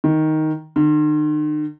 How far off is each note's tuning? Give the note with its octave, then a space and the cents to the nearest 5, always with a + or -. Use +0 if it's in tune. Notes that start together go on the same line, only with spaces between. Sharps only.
D#3 +5
D#3 -45